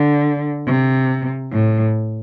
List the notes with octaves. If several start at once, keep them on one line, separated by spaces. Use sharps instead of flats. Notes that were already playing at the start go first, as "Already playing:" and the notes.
Already playing: D3
C3
A2